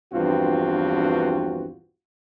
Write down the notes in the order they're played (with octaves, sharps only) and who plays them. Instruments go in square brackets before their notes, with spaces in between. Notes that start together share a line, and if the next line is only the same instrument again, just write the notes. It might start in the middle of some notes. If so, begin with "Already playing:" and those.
[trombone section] A#1 E2 G2 C4 F4 F#4